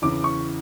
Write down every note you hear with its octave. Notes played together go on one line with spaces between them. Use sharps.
E2 C#3 E3 D6
C#6